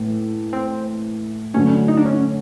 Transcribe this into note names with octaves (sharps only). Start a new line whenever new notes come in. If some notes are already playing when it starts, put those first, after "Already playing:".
Already playing: A2 E3 A3
C4
D3 F#3 A3 C#4
D#4
D4
C#4